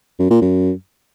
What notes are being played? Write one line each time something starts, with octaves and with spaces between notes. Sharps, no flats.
F#2
A#2
F#2